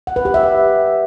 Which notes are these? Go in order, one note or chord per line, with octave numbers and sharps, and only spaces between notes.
F#5
B4
G4
E5
B4